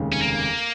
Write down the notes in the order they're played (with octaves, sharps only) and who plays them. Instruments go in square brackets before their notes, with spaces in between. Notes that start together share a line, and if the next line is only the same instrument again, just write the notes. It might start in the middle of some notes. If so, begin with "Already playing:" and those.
Already playing: [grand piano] F1 D#2 C#3 G#3
[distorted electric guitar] C#4
A#3